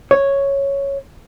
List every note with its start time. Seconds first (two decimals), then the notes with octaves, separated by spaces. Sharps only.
0.11 C#5